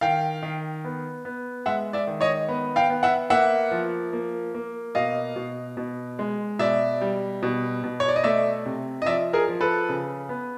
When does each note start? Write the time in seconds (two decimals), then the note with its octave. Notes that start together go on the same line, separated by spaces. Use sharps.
0.01 D#3 F5 G5
0.42 D#3
0.85 B3
1.25 B3
1.66 G#3 E5 F#5
1.93 D5 E5
2.07 D#3
2.21 C#5 D#5
2.49 B3
2.76 F5 G5
2.90 B3
3.03 E5 F#5
3.30 A#3 E5 F#5
3.71 F3
4.13 A#3
4.54 A#3
4.95 B2 D#5 F5
5.36 B2
5.77 B2
6.19 G#3
6.59 B2 D5 E5
7.01 G3
7.43 B2
7.84 B2
8.00 C#5
8.08 D5
8.16 D#5
8.24 A3 D5 E5
8.66 C3
9.02 D#5
9.06 F3 D5 E5
9.33 G#4 A#4
9.48 F3
9.61 A4 B4
9.89 C#3
10.29 B3